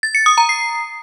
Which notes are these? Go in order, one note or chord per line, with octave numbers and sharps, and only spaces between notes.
A6
C#7
D#6
A#5
C7